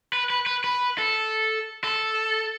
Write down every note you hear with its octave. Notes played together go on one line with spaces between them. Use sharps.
B4
B4
B4
B4
A4
A4